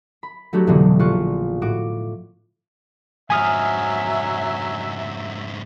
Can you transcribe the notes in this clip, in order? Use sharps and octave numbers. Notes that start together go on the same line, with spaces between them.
B5
F#3 A3 D4 F#4 G4
F1 B2 D3 E3 D4
A#1 F4 C#6 F#6
A2 F#4 D6
F2 G#2 F#3 E5 G#5 D#6 F6